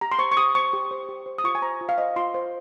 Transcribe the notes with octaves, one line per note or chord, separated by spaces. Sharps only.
G4 A#5
C6
C5 C#6
C#6
G4 D#6
C5 C#6
G4
C5
G4
C5
D#6
F4 C#6
G#5
C5 A#5
F4
F5
C5 D#5
F4 C6
C5